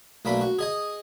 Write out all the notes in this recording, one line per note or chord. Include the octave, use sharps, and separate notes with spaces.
B1 A3 A#3 D4 B5
F#4
G#4 D#5 G#5